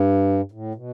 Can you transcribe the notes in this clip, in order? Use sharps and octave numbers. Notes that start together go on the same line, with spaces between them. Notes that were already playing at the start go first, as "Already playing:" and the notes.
Already playing: G2
A2
B2